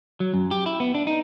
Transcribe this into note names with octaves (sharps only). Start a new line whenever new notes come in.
F#3
F#2
G4
E4
B3
D4
D#4